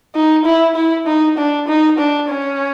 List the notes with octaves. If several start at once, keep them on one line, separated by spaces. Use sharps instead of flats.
D#4
E4
E4
D#4
D4
D#4
D4
C#4